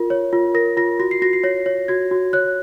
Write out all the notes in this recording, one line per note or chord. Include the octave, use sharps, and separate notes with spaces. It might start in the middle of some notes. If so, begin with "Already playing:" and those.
Already playing: F4 A#4
C#5
F4
A#4 A#6
F4 A#6
F#4 A#6
C7
F#4 A#6
C7
C#5 A#6
C#5
F#4 G#6
F#4
C#5 F#6